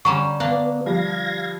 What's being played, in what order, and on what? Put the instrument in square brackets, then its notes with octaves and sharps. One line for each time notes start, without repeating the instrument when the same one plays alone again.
[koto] D3 G3 C#4 [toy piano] A#5 C#6
[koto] A#3 D4 [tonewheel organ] B3
[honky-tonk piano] F3 G3 [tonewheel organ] F5 G#6 A#6